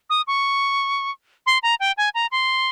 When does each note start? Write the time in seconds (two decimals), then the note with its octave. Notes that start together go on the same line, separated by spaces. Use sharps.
0.10 D#6
0.27 C#6
1.46 C6
1.63 A#5
1.80 G5
1.97 G#5
2.14 A#5
2.31 C6